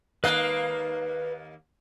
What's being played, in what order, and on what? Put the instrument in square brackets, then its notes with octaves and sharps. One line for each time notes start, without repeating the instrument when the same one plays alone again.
[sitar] D#2 A#3 D#5 [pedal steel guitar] B4 F5 F#6